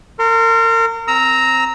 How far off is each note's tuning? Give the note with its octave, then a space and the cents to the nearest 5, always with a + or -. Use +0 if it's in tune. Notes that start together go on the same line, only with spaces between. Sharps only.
A#4 -35 C6 +0
C4 +5 A#5 +0 E6 -25